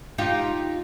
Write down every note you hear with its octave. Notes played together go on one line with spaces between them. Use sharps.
D#4 F4 G4